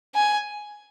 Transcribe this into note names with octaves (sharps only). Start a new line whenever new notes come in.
G#5